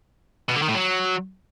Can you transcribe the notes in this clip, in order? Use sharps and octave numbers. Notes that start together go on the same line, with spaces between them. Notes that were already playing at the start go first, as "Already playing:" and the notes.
B2
D3
D#3
A2
F#3